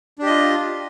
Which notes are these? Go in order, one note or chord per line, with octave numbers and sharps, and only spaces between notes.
D4 F4 G4 D#5